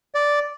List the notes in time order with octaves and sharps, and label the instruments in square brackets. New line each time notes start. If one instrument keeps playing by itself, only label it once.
[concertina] D5